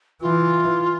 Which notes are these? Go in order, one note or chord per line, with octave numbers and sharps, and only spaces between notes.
E3 F4